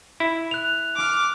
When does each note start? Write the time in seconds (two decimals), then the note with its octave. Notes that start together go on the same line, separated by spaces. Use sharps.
0.20 E4
0.51 F#6 F7
0.96 D6 F6